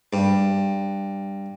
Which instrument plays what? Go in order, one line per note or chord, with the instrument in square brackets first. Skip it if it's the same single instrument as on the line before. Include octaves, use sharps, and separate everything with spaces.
[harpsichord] G2